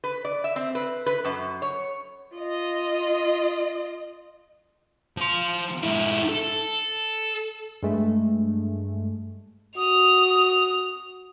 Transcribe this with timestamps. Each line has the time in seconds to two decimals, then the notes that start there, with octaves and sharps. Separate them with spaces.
0.04 B4
0.25 D5
0.44 E5
0.56 C4
0.75 B4
1.06 B4
1.25 F#2
1.62 C#5
2.36 F4 D#5
5.17 F3 C6
5.83 G#2 E4
6.29 A4
7.83 G2 G#3 A3
9.77 F#4 D#6 F7